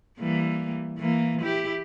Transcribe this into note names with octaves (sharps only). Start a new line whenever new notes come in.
E3 G3 A#3
E3 A#3
E4 G4